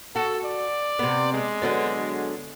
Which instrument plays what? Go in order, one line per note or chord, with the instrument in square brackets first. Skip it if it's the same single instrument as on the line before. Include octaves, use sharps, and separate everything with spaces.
[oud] F#4 [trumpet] A4
[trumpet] D5
[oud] C3 B3
[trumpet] G#3
[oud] D3 F#3 B3